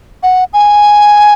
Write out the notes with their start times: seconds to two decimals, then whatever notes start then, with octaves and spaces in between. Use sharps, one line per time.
0.23 F#5
0.53 G#5